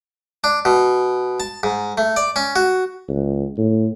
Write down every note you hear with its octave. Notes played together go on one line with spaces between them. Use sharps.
D4
B2
A5
G#2
A3
D5
C#4
F#4
C#2
A2